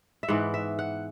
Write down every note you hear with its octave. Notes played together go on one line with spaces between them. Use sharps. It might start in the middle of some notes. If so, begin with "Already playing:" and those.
E5
G#2 E3 B3 F#5
E5
F#5